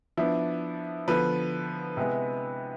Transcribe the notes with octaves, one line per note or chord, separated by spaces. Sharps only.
F3 B3 D4 E4
D3 F3 B3 B4
C3 G#3 B3 E4